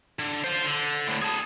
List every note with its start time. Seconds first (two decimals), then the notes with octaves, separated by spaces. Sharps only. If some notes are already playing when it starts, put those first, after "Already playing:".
0.19 D3
0.44 F4 C5
0.65 D3
1.07 D2 A2
1.22 G#4 A5